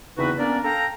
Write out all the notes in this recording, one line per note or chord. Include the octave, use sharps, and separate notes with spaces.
E2 C#3 C4 D#4 F#4 B4
A#3 B3 C#4 D4 A#4 D5
A4 F5 G5 A#5